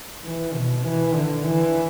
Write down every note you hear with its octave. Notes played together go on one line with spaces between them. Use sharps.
E3
B2
E3
D3
E3